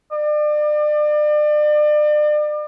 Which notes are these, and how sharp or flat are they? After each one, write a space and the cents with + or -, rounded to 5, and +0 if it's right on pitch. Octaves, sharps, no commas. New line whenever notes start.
D5 +35